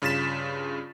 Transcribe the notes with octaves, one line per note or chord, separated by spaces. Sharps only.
G2 C#3 F4 A6 B6 E7